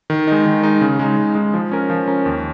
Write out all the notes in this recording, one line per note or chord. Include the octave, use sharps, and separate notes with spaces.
D#3
G#3 D#4
D#3
G#3 D#4
C#3
G#3 D#4
C#3
G#3 D#4
F3
C#4 A#4
F3
C#4 A#4
D#2